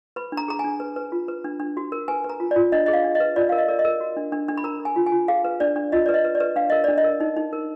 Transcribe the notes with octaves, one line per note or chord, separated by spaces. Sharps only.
B4 B5
D4
A#5
G#4 A#5
G#5
D4
B4
B4
F4
B4
D4
D4
F#4
A#4
B4 G#5
B4
A#5
F4
D5
F4
D4 D#5
G#4 D#5
F5
D4
D#5
B4
F4 D5
A#4 F5
D#5
A#4 D5
D#5
A#4
F#4
D4
D4
D4
B5
A#4 A#5
A#4
G#5
F4
G#5
F4
G#4 F5
B4
D4 D5
D4
F4 D#5
D5
B4
D#5
B4
D5
B4
D4 F5
A#4 D#5
D4 D5
D#5
A#4
D#4
D#4
A#4